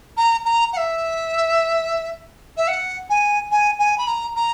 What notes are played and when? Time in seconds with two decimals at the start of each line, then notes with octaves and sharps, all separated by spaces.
0.17 A#5
0.45 A#5
0.73 F#5
0.77 E5
2.56 E5
2.67 F#5
3.09 G#5
3.51 G#5
3.79 G#5
3.97 B5
4.07 A#5
4.35 A#5